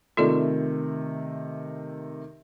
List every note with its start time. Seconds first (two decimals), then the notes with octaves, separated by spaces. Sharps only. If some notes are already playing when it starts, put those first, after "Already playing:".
0.17 C3 D#3 A3 F4 A4 D5